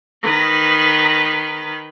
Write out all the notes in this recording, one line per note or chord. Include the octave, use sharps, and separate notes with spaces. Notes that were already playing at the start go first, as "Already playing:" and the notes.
D#3 B4